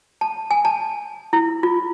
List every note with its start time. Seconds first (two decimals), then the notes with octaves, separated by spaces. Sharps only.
0.21 A5
0.51 G#5
0.65 A5
1.33 E4
1.63 F4